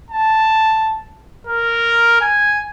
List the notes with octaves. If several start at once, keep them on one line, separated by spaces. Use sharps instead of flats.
A5
A#4
G#5